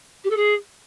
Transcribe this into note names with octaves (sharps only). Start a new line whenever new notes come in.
G4
A4
G#4